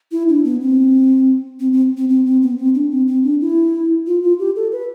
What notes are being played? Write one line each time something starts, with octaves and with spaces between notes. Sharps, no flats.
E4
D4
B3
C4
C4
C4
C4
C4
C4
B3
C4
D4
C4
C4
D4
E4
F4
F4
G4
A4
B4